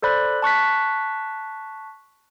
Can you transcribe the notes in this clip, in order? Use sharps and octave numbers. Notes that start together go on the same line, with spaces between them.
A4 C5 D5 B5 F#6
A5 C#6 F#6 B6